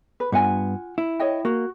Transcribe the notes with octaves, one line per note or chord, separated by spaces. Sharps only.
B4
G2 B3 F4 F#5 G#5
E4
C#5 D#5 G5
A#3 F#4